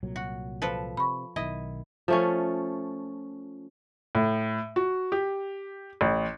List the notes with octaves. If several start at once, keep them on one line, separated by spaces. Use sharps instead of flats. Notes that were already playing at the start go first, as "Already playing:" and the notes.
C2 A#2 F#3
F#4
F3 A4 B4
C3 B5 C#6
B1 D#3 E4 D#5
F3 A3 C#4
A2
F#4
G4
A1